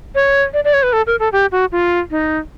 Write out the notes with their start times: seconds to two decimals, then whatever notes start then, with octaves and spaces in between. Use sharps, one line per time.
0.15 C#5
0.53 D5
0.64 D5
0.73 C#5
0.83 B4
0.93 A4
1.07 A#4
1.20 A4
1.32 G4
1.52 F#4
1.72 F4
2.10 D#4